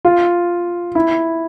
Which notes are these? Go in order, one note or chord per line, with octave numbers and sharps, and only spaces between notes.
F4
E4